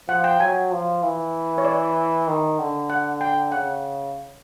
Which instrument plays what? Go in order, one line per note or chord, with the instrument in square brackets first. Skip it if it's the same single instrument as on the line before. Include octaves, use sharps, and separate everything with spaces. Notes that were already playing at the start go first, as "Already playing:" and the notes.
[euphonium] F3 [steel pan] F#5
[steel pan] G5
[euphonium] F#3 [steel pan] G#5
[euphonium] F3
E3
[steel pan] C#5
D5
[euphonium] D#3
D3
[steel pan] F#5
G5
[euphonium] C#3 [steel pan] F#5